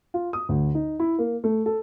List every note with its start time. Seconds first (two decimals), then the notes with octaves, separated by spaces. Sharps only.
0.14 F4
0.33 D#6
0.49 D2
0.75 D#4
1.00 E4
1.19 A#3
1.44 A3
1.66 A4